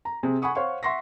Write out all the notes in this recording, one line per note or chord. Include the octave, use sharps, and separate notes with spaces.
A#5
C3 C4 G#4
F#5 G#5 B5 C#6 D#6
C5 C#5 F5 F#5 C6 C#6
E5 F#5 C6 C#6 A#6